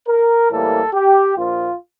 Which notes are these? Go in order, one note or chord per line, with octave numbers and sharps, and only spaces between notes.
A#4
A2 E3 G3 A#3 A4
G4
A#1 A#2 F3 F4